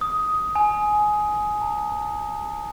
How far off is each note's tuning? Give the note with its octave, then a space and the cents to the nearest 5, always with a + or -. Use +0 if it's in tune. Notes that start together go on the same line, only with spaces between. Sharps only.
D#6 +10
G#5 +15
A5 +45